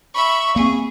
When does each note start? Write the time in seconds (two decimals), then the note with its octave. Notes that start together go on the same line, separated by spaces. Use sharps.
0.14 E5 B5 C#6
0.56 A#3 C4 G#4